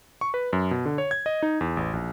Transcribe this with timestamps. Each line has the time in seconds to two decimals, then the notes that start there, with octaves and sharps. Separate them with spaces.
0.21 C#6
0.34 B4
0.53 F#2
0.71 B2
0.86 D3
0.98 C#5
1.11 G#6
1.26 D#5
1.43 D#4
1.61 E2
1.77 A1
1.93 A#1